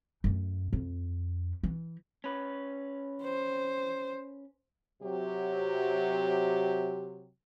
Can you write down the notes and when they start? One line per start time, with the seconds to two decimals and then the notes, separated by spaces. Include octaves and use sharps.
0.24 F#2 A3
0.73 F2
1.63 E3
2.24 C#4 B4
3.22 C5
5.02 C3 F#3 G4